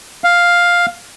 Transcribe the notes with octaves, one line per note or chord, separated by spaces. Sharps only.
F5